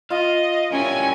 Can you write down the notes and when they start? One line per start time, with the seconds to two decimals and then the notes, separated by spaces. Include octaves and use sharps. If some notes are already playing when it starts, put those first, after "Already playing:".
0.10 F4 D#5 F5
0.72 G3 C#4 E4 A#4 G#5